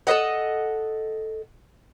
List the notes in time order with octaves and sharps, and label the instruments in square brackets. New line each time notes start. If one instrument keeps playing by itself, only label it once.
[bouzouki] A4 B4 D#5 F#5